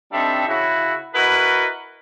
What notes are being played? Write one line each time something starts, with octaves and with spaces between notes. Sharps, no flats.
G3 C4 D4 D#4 A4 E5
C#3 E4 F#4
E4 F#4 A#4 B4 D#5 F#5